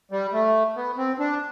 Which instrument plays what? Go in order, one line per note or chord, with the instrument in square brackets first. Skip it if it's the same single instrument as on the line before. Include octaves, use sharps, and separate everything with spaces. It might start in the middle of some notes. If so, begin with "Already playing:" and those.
[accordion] G3
A3
B3
C4
D4